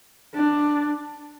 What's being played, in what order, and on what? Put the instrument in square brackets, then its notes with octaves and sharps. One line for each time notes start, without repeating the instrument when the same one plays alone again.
[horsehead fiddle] D4